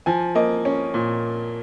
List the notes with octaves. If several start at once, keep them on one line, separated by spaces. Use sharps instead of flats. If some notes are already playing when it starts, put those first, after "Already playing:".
F3 G#5
A#3 D#5
C#4
A#2